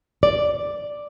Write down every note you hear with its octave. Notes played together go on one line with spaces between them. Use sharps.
D5